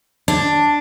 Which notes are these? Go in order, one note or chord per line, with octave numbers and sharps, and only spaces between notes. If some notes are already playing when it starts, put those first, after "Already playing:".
D4